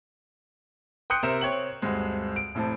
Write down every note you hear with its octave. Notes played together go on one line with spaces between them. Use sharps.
G5 C6 D#6 F#6 G6 C#7
C3 A#4 C5 E5 E7
C4 C#5 G5 F#7
D2 G2 G#3 C4
D7
F1 A2 C4 A5